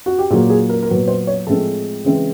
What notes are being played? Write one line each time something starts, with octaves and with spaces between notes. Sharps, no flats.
F#4
G4
A#2 F#3 A#3 G#4
G#4
A#4
A#4
A#2 F#3 B3 B4
C5
C#5
A2 F3 G#3 C4 A4
C#3 E3 G#3 C4